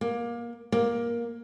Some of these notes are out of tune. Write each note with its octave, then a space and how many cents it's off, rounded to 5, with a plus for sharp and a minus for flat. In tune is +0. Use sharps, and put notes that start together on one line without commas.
A#3 +20
A#3 +15